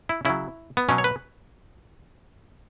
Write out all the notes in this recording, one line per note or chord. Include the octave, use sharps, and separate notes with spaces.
E4
C#3 F#3 E4
B3
B2 F#3 C#4
C#5
B4